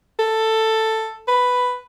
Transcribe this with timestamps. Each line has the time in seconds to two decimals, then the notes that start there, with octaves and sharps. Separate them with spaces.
0.19 A4
1.28 B4